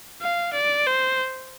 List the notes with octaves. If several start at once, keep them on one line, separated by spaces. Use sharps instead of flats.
F5
D5
C5